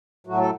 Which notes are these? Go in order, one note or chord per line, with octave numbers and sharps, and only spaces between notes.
A2 F#3 A3 F#4
A4